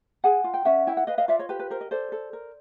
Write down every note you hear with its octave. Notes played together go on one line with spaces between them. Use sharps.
G#4 F#5 G#5
F4
G5
C#4 E5 F#5
E4 G5
F#5
B4 D#5 F5
D#5 F5
F4 D5 E5
C#5 D#5
G4 B4
B4
A#4 C5
D#5
A4 C5 D5
A4
A#4